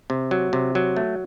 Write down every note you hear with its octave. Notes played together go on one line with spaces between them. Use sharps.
C3
F#3
C3
F#3
A3